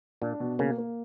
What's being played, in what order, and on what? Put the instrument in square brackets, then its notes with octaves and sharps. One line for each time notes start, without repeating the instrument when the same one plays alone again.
[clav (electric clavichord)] A#2 [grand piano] D4
[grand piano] B2
[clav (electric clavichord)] C#3 [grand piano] A#3
[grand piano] A#3